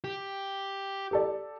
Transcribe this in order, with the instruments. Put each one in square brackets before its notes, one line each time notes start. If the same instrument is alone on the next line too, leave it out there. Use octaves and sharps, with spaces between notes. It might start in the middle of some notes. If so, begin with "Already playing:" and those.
[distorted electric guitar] G4
[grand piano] G4 A4 D5